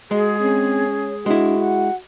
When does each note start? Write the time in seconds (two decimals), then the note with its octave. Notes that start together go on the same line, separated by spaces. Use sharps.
0.11 G#3 F#4 G#4
0.40 C4 C#4
0.90 C#5
1.26 G#3 D4 E4 F#4
1.59 F#5